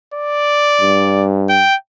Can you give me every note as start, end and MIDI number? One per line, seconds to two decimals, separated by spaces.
0.14 1.27 74
0.81 1.66 43
1.49 1.75 79